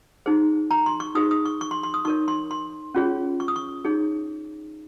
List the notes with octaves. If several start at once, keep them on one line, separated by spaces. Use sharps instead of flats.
D#4 G#4 C5
A#5
C6
C#6
D#4 G#4 C5 D#6
D#6
C#6
C#6
C6
C6
D#6
D#4 A#4 C#5 C#6
C6
C6
C#4 F4 G#4 C#5
C#6
D#6
C#6
D#4 G#4 C#5